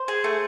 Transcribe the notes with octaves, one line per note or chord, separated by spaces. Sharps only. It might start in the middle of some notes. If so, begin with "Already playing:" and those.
Already playing: C5
G#4
A3